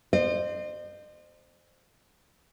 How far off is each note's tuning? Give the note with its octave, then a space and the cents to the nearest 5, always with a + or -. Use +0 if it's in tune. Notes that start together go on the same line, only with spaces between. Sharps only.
C5 +0 D#5 -45